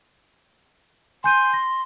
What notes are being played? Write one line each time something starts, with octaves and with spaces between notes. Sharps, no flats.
G#5 C6 G6 D#7
A#6